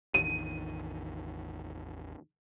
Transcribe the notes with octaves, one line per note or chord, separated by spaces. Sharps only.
A1 E2 D#3 D#7